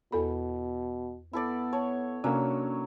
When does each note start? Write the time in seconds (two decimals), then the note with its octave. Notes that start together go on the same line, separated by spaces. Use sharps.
0.12 E2 B2 A4 B5
1.33 B3 E4 A4 D5
1.73 C#5 A5
2.24 C3 F#3 A#3 C#4 D4